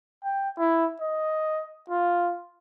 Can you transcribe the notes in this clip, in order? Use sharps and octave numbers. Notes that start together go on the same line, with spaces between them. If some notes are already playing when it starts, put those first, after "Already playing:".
G5
E4
D#5
F4